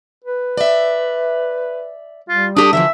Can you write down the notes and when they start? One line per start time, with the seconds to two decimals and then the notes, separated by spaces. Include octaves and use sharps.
0.25 B4
0.57 D5 E5
2.29 G3 F4
2.57 D4 G4 A4 D#6
2.73 D3 E3 F3 E5